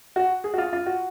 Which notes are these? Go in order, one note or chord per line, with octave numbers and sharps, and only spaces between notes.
F#4
G#4
F#4
F4
F4
F#4